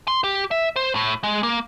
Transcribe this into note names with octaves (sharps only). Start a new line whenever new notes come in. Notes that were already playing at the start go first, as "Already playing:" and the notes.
C6
G4
E5
C5
A2
G#3
A#3